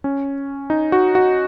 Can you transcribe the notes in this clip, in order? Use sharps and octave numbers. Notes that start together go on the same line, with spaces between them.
C#4
D#4
F#4
F#4